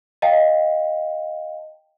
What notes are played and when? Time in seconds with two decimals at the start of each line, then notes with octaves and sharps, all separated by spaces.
0.22 D#5 F5 G5 A5